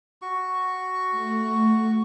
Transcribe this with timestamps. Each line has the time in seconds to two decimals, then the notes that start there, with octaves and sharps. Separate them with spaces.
0.22 F#4 C#6
1.11 A3